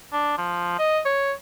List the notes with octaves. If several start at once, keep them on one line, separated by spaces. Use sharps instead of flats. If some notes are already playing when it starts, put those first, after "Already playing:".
D4
F3
D#5
C#5